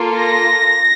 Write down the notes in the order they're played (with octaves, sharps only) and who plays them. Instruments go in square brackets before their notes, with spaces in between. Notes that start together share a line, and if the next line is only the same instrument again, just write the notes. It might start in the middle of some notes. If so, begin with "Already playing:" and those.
Already playing: [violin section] A#3 F4 A4
A#6